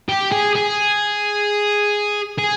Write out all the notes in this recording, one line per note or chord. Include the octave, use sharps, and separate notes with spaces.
G4
G#4
G#4
G#4